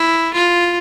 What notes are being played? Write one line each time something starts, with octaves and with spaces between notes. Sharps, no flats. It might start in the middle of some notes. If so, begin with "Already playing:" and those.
Already playing: E4
F4